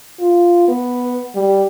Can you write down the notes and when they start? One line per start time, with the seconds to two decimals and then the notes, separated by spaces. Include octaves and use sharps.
0.19 F4
0.68 B3
1.35 G3